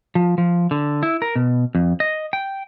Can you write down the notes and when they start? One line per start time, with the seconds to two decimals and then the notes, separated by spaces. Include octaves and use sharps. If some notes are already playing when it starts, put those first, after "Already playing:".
0.15 F3
0.38 F3
0.71 D3
1.03 E4
1.22 A#4
1.36 B2
1.75 F2
2.00 D#5
2.33 G5